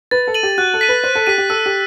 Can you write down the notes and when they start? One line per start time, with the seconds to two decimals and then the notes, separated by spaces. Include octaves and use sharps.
0.11 B4 A6
0.27 A4
0.34 D#7 F#7
0.43 G4
0.58 F#4 F#6
0.74 A4
0.81 B6 D#7
0.89 B4
1.04 C5 F#6
1.15 A4
1.27 G4 B6 D#7
1.38 G4
1.49 A4 E6
1.66 G4